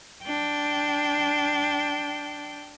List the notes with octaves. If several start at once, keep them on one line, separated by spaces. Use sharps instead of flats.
D4 G5